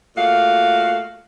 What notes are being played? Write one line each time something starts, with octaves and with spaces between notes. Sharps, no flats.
A#2 A3 F#4 F5